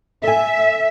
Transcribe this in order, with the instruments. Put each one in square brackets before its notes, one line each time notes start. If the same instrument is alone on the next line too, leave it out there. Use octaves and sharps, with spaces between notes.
[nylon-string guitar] A4 G#5 [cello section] E5